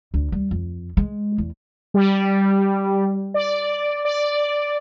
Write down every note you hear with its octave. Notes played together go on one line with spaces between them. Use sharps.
D2
G3
F2
G#3
E2
G3
D5
D5